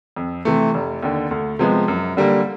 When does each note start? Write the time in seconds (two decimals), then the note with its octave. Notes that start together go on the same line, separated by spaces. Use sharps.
0.16 F2
0.45 C3 E3 A3
0.74 F1
1.03 D#2 D3
1.31 D2
1.59 C3 F3 G#3 B3
1.88 F#2
2.17 D3 G3 A#3